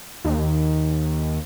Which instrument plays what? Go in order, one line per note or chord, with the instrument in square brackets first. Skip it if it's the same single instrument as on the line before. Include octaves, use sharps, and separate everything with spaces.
[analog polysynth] D#2